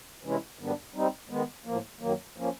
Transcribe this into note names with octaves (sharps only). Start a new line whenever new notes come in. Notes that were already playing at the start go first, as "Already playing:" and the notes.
C3 E3 G#3 C#4 E4
G#2 D#3 G3 B3 D4
G3 C4 D#4
D#3 G#3 B3
A2 F3 A#3
F#2 D#3 F#3 A#3
F3 A#3 C#4